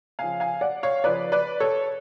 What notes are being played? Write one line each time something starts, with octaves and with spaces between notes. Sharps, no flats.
C#3 F3 F5 G#5
F5 G#5
D5 F#5
C#5 F5
C#3 F3 B4 D5
B4 D5
A4 C#5